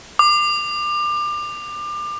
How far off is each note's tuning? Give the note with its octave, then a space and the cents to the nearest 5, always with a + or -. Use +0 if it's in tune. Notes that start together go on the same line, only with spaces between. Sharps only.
D6 +30